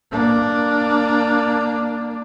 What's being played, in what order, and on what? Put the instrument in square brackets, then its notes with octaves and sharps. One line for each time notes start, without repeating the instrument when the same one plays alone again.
[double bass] A#3 D4